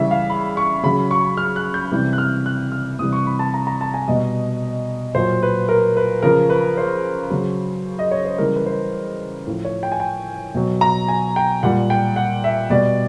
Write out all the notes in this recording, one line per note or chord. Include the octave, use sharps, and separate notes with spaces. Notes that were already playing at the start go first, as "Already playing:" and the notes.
Already playing: C#3 E3 G3 E5
F5
B5
C#6
C#3 F#3 B5
C#6
F6
F#6
G6
C3 E3 G3
F#6
F6
F#6
F6
C3 E3 G3 D#6
C#6
B5
A5
A#5
A#5
A5
G#5
B2 G3 D#5
A#2 F#3 C5
B4
A#4
B4
C#3 F3 A#4
B4
C5
C#3 F#3
D#5
C#5
C5
C#3 E3 G3 A#4
B4
C5
A2 F3
C#5
G5
G#5
G5
B2 F#3
A#5
G#5
G5
A#2 G3 F#5
G5
F#5
E5
B2 G3 D5